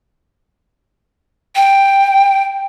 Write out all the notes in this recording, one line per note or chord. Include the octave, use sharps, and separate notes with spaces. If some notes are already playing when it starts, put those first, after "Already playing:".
G5